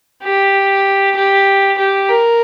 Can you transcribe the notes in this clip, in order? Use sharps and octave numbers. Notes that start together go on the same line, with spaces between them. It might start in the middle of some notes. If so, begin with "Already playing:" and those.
G4
G4
G4
A#4